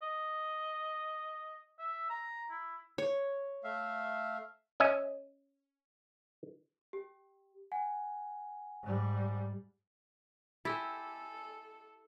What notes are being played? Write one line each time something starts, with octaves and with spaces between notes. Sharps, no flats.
D#5
E5
A#5
E4
C#5
A3 E5 F5
C#4 D#5 E5 G#5
G4
F#5 G#5
G#2 G3
E4 G4 A4 G#5 C6 E6 A6